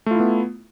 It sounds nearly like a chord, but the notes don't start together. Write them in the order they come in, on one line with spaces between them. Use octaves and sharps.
A3 F4 E4 B3